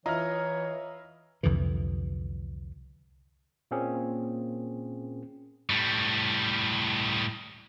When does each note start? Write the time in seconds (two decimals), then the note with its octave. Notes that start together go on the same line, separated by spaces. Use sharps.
0.06 E3 E4 F4 C#5 D#5 A#5 F6
1.43 C2 F2 D3 E3
3.71 A#2 A#3 C4 C#4 G#4
5.70 A2 G3